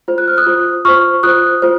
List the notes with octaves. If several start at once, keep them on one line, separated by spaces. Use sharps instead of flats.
F4 C5
F#6
F6
D#6 F#6
F4 C5
F4 C5 C#6 F6
F4 C5 D#6 F#6
F4 C5